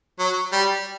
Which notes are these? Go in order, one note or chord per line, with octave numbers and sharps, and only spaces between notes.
F#3
G3